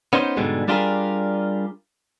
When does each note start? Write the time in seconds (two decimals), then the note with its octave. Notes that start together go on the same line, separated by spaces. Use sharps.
0.13 B3 C#4 D#4 C5
0.37 G#2 B2 D3 G3 G#3
0.68 G3 D4 F4 G4 G#4 A#4